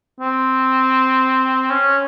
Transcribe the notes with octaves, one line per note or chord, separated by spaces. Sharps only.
C4
C#4